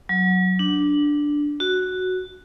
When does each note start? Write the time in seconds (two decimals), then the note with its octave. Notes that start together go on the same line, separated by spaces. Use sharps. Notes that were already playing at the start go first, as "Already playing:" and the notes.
0.09 F#3
0.59 D4
1.60 F#4